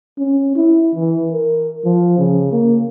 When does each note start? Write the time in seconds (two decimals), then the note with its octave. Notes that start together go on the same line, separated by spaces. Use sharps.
0.18 C#4
0.55 E4
0.95 E3
1.32 A#4
1.85 F3
2.18 C#3
2.52 A#3